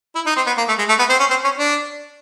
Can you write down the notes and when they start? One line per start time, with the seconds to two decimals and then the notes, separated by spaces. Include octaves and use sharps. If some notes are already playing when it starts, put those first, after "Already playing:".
0.15 E4
0.26 D#4
0.36 C4
0.47 B3
0.58 A#3
0.68 A3
0.79 G#3
0.89 A3
0.99 B3
1.10 C4
1.20 C#4
1.30 C4
1.44 C#4
1.58 D4